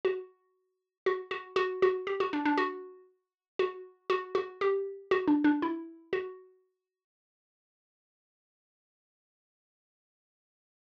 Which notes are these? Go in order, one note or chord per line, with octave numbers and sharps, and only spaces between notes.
F#4
F#4
F#4
F#4
F#4
G4
F#4
D4
D4
F#4
F#4
F#4
F#4
G4
F#4
D4
D4
E4
F#4